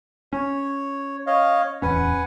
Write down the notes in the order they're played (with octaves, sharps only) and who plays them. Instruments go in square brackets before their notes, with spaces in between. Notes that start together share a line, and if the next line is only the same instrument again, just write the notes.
[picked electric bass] C#4 [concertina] C#5
[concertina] C#5 D#5 F5
[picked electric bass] D1 E2 C#4 [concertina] B4 F#5 G#5